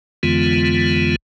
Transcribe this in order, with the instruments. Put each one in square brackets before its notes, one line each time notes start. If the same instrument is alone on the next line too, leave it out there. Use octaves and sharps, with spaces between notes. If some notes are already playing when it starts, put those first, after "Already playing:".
[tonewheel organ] F2 D3 E3 G#3 B3 F4